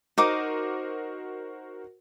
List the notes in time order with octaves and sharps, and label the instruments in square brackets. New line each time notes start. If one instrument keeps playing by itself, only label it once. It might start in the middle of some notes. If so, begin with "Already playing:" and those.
[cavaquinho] D#4 D6 [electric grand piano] F#4 A#4 C5